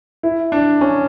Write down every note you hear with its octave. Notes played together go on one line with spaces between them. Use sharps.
E4
D4
C#4